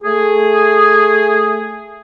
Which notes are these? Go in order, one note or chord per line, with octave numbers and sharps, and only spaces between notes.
A3 G#4